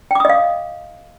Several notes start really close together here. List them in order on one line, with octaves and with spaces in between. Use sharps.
G5 D6 D#6 D#5 F5